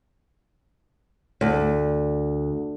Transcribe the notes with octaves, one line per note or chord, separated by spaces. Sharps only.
D2